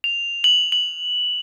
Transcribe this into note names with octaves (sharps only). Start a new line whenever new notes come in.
F7
F#7
F#7